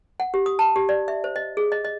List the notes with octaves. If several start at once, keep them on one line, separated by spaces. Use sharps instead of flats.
F#5
G4
D#6
A5
G4
D5
E5
C5
D#5
G#4
D#5
D#5